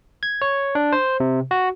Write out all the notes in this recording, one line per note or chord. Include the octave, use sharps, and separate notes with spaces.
G#6
C#5
D4
C5
C3
F#4